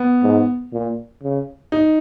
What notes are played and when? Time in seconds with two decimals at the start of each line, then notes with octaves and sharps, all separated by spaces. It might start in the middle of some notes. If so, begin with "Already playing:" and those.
Already playing: B3
0.23 G#2
0.73 A#2
1.23 C#3
1.72 D#4